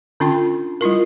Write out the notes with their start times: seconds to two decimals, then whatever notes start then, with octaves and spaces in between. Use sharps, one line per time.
0.20 D3 C#4 D4 F4 G5 C6
0.81 G3 E4 F4 A#4